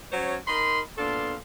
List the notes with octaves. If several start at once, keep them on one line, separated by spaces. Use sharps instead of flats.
F#3 C#4 C5 C#5
D#4 A#4 B5 C6
A#2 B3 D4 A4 F5 C6